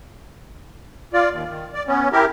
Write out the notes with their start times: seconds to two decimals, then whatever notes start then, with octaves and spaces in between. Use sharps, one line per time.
1.13 F4 D5
1.31 D#2
1.49 D#3
1.74 D5
1.88 B3 C#4
2.12 E4 G4 A#4